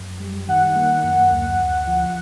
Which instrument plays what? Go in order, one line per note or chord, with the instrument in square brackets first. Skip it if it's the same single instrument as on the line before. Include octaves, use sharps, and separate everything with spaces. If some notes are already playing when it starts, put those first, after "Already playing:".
Already playing: [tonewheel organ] F#2
G3
[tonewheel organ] D#3 [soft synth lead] F#5
[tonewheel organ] A#3
F#2
D2
D2
F3